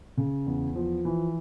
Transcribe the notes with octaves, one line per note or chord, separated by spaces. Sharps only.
C#3
E2
F3
E3